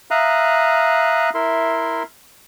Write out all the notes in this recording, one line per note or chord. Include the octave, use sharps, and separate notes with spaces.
E5 F5 A#5 D#6 F#6
E4 A#4 E5 C6